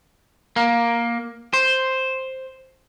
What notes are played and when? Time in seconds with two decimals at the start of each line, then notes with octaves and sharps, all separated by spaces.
0.56 A#3
1.53 C5